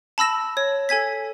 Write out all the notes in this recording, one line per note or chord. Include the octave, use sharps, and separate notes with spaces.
A5 B5 E6 A#6 E7
C#5
A4 G#5 G#6 B6